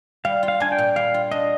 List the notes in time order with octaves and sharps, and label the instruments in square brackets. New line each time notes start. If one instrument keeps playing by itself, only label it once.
[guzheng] G3 [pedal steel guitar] F5
[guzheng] F4
[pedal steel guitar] F5
[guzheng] D4 [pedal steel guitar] G#5
[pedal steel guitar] G5
[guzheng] A#2
[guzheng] G3 [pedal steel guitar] F5
[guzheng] F4
[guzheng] D4 [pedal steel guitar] D#5